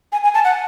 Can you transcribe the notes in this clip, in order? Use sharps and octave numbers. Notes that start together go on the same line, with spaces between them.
G#5
G#5
A5
F#5